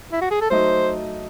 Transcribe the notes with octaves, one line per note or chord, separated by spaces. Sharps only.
E4
F#4
G#4
A4
F#3 A3 D#4 C5